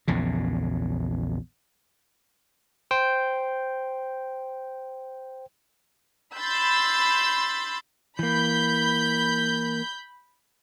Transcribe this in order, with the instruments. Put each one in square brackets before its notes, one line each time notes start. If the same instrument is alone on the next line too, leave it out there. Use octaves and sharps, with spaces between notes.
[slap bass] A#1 E2 C#3
[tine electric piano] C5 G5
[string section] B5 C6 E6 G6 A6
[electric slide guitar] E3 A#3 [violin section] B5 G6